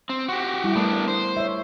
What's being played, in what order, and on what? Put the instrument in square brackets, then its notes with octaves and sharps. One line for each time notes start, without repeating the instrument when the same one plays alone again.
[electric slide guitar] C4
F#4 G4
[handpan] G3 E4
[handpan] A3 A#4 [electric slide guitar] B3 D4
[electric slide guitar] C5
[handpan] C#5 E5